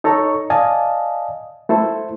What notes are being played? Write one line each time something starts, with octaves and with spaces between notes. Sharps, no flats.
D#4 A4 C#5 A#5 C#6
D5 D#5 F5 G#5 A5 D#6
A3 E4 A4 C5